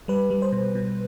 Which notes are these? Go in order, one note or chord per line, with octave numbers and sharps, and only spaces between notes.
G3 B4
G3
C5
B2
B2